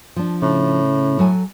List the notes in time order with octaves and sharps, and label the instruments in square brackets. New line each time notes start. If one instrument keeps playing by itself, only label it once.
[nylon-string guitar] F3 D4
[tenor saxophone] A2 [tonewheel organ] C#3
[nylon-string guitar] F#3 A4 G#5